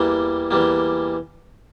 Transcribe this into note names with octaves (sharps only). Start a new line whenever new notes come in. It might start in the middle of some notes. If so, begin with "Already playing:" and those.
Already playing: E2 E3 G3 A#3
E2 E3 G3 A#3